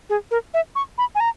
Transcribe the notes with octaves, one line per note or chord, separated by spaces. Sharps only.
G#4
A#4
E5
C#6
B5
G#5
A#5